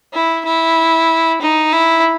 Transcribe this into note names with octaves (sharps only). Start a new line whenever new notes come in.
E4
E4
D#4
E4